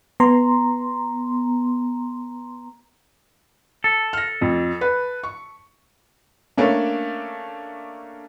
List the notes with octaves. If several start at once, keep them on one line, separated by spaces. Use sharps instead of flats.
B3 A#5 C6
A4
F6 A#6
F2
B4
C#6
A3 A#3 C#4 D4